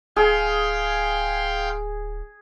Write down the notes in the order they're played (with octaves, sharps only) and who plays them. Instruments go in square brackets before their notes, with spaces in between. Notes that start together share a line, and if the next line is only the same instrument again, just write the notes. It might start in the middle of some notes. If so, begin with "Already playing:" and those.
[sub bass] D1 [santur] G#4 [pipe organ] F5 G5 C6